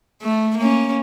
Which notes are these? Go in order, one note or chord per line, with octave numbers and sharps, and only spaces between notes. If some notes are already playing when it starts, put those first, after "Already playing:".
A3
A#3 C#4